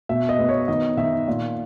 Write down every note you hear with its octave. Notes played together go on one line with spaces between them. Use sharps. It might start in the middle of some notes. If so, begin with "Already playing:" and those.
B2 E5
D#5
B3
C#5
D#3 D#5
D#3 E5
A#2